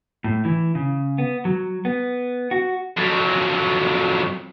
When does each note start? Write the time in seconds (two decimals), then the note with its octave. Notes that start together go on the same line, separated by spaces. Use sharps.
0.24 A2
0.45 E3
0.75 C#3
1.18 B3
1.45 F#3
1.85 B3
2.51 F#4
2.97 F2 F#3